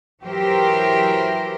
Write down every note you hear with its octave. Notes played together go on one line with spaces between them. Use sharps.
E3 F#3 G4 A#4 C5 E5